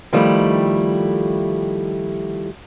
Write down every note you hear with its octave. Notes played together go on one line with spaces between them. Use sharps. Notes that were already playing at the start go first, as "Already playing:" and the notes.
D#3 F3 G3 A3 E4 A4